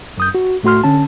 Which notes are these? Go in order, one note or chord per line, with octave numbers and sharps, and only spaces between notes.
F#2 D#6 G6
F#4
A2 A3 F#4 C6 F6
D3 C#4 A5